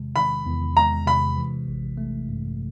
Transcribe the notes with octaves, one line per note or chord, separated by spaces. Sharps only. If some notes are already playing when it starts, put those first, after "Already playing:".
Already playing: E2 C3 D#3 G#3
D#3 B5
E2
G#3 A#5
C3 B5
E3
A1
A3
G2